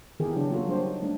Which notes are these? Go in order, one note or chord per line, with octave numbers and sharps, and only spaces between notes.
D#3 E3 B3 G4 G#4 A#4
C#3 F#3 D4 G4
A#3 F4 F#4 A4
F#3 G3 A#3 D4 G4 C5
D#4
G3 A3 D4